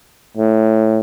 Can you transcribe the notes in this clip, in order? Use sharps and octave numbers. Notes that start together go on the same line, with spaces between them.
A2